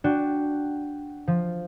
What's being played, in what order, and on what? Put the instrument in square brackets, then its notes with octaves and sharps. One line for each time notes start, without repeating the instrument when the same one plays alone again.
[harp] D4 F#4 G5
F3